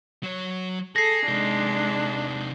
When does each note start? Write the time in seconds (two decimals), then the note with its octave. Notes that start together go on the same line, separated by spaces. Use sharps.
0.23 F#3 C#5
0.96 G#4 A4 A#6 C7
1.28 C3 G#3 D4 D#4